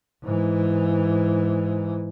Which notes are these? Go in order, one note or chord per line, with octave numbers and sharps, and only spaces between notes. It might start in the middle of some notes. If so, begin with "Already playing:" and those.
G#2 E3